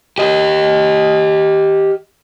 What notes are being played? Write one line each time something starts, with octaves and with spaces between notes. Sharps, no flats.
G4 D#5